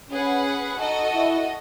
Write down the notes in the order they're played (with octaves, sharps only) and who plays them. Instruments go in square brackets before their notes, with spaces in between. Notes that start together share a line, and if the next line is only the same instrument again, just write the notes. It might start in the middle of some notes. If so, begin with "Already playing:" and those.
[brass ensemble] C#4 [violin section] G#4 B4 F#5
[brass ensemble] D#4 [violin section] F#4 A4 D#5
[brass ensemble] E4